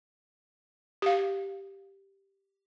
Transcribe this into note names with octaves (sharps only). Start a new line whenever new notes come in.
G4 F5